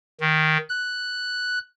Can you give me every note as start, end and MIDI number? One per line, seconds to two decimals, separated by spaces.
0.21 0.58 51
0.70 1.59 90